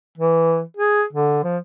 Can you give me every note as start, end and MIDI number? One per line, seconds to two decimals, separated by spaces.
0.18 0.62 52
0.77 1.04 68
1.13 1.43 50
1.44 1.58 53